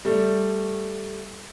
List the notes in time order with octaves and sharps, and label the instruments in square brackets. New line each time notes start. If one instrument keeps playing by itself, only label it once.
[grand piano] G3 A3